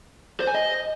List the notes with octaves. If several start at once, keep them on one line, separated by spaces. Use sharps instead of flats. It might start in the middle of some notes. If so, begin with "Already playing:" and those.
C5
G#5
D#5